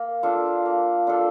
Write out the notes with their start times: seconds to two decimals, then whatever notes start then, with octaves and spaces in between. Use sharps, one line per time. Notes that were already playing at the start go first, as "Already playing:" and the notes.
Already playing: A#3
0.23 D4 F4 A4
0.65 A#3
1.07 D4 F4 A4